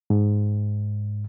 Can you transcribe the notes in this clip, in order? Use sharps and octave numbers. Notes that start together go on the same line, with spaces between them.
G#2